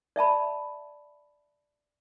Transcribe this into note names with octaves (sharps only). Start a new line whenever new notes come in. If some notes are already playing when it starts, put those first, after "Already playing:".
D5 E5 A5 B5